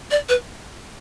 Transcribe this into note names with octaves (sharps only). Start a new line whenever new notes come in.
D5
B4